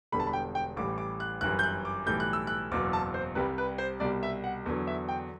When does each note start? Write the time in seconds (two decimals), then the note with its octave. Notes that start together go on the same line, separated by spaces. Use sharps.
0.12 E1 E2 D3 G3 B5
0.20 A5
0.27 B5
0.33 G5
0.55 G5
0.76 A1 A2 E3 G3 D6
0.98 D6
1.20 F#6
1.41 G1 F#2 E3 G3 F#6
1.59 G6
1.63 F#6
1.85 D6
2.06 B1 A2 E3 G3 G6
2.20 F#6
2.33 E6
2.47 F#6
2.71 F#1 E2 B2 F#3 D6
2.93 A5
3.14 C5
3.35 C2 C3 G3 B4
3.58 B4
3.78 C5
4.00 C2 B2 G3 D5
4.23 E5
4.44 F#5
4.66 E2 D3 F#3
4.87 E5
5.09 G5